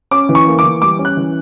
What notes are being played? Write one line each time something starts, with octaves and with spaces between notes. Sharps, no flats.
C#4 D6
E3
C#6
A#3
D6
E3
G3 D6
C#4
F#6
E3